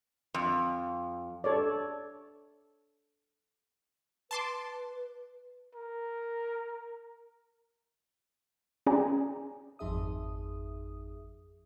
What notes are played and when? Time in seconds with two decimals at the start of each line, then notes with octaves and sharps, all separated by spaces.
0.34 F2
1.44 A4 C#5 D5
4.31 B4 A5 C6 D6
5.75 A#4
8.87 C#4 G#4 D5 G5 G#5 A#5
9.79 G#1 F2 D#4 G#4 E5 D#6